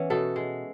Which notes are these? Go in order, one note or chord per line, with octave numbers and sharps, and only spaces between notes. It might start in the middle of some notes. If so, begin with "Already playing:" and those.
Already playing: E3 B3 C#4
B2 A4
G#3